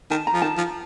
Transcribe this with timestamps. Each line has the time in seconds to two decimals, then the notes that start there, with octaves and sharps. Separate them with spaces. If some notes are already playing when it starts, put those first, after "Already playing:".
0.11 D#3 A5
0.27 A#5
0.34 F3
0.42 D#3 A5
0.58 F3